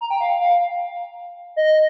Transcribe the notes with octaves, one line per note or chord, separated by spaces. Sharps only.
A#5
G5
F5
F5
D#5